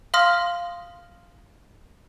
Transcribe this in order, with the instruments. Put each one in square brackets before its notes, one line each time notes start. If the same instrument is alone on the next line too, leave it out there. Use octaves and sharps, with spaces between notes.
[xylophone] F5 C6 D#6 F6 A#6